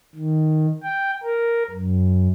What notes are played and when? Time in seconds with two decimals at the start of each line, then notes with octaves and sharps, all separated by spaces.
0.15 D#3
0.83 G5
1.23 A#4
1.71 F#2